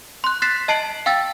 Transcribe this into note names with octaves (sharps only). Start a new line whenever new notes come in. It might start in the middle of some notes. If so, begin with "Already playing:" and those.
C6 F#6
F#6 A6 B6 C7 E7
D#5 A5 C7 D7 F#7
F5 G5 E6 A6